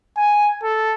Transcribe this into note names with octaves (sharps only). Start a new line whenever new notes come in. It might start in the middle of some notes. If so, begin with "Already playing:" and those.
G#5
A4